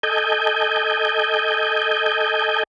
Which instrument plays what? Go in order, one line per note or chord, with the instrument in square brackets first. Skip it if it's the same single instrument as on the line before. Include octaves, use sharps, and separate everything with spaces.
[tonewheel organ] A4 D#5 G#5 G6